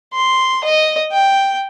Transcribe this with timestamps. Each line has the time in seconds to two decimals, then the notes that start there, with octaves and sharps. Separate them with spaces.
0.13 C6
0.64 D#5
1.12 G5